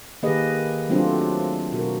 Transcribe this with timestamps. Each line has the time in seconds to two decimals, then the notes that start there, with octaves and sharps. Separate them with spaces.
0.23 D#3 A#3 G4 G#4 B4 D#5
0.89 F#3 A3 C4 D4 F4 F#4
1.72 B2 F#4 A#4